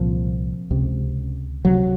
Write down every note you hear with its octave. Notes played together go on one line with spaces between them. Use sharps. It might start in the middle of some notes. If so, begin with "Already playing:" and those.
Already playing: C2 A#2 F3
C#2 C3
C#2 C3 F#3